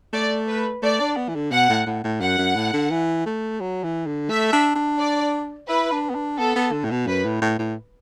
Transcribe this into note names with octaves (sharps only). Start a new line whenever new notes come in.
A3 D5
B4
A3 D5
D4
B3
E3
D3
B2 F#5
A2
A2
A2
F#2 F#5
F#2
A2
D3
E3
A3
F#3
E3
D3
A3 E5
D4
D4
D5
E4 B4
D4
B3
D4
B3 A4
B3
D3
A2
B2
F#2 B4
A2
A2
A2